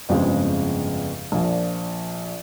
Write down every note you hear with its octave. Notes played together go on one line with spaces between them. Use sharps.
G1 F2 C#3 G#3 C4
A#1 A#2 F3